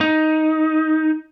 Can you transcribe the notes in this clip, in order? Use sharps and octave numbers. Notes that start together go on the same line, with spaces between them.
D#4